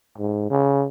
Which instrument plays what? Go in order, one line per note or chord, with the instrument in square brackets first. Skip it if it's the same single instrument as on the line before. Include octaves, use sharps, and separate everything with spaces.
[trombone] G#2
C#3